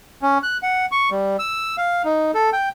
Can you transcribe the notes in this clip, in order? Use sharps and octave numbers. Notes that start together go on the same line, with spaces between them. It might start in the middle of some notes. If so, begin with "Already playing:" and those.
C#4
F#6
F#5
C#6
G3
E6
F5
D#4
A4
G5